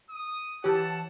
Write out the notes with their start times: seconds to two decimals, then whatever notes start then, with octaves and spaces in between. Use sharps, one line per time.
0.10 D#6
0.64 E3 G4 C#5 F#5 A5